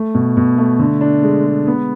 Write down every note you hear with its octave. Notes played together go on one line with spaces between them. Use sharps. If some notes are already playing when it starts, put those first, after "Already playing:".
Already playing: A3
B2
B2
A3
D3
D4
G#3
G#3
B3